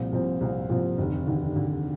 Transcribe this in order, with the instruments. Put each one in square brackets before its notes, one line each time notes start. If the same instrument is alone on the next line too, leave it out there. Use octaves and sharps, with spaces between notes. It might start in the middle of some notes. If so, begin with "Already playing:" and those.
Already playing: [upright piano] C2 A#2 F3 C4
C2 A#2 F3 C4
C2 A#2 F3 C4
C2 A#2 F3 C4
F1 D#2 D3
F1 D#2 D3
F1 D#2 D3